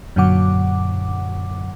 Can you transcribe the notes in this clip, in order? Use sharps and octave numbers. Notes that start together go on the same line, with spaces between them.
F#2 A#2 D3 F#3 F#5 D6